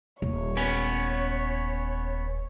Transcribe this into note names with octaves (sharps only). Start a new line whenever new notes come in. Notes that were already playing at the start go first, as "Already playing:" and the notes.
D#1 C#5
B3 C#4